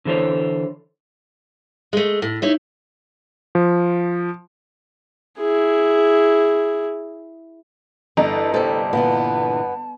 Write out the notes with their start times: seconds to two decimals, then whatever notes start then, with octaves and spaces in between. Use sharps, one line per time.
0.05 D3 E3 A4 C5 C#5
1.93 G#3 A3
2.22 A2
2.42 D#4 E4 C#5
3.55 F3
5.39 E4 G#4
8.17 G1 E3 B3 D4 A4 D#5 A#5
8.54 C3 G3 B3 A4 A5
8.93 A#2 D3 E3 B3